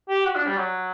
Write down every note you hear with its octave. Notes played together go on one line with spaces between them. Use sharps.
G4
F#4
D4
G3
F#3